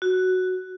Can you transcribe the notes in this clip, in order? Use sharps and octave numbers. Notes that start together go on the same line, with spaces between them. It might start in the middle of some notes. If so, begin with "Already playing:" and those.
F#4